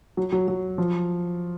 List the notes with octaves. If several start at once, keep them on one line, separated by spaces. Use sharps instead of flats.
F#3
F#3
F#3
F3